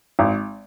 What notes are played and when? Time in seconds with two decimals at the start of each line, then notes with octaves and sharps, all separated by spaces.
0.19 G#1